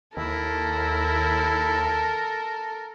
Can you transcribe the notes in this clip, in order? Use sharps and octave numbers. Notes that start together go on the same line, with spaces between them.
D#2 E4 A4 A#4